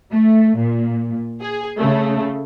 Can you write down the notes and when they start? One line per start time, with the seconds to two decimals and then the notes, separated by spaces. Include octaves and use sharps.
0.13 A3
0.58 A#2
1.41 G#4
1.78 C#3 A3